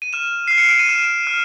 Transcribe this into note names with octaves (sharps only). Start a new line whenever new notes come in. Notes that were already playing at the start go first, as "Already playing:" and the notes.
D#7
F6 E7
F6 C7
C#7
D7
D#7
F6 E7
F6